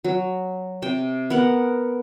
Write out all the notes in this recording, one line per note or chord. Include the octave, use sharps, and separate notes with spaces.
F#3
C3 G5
B3 A#4 F#5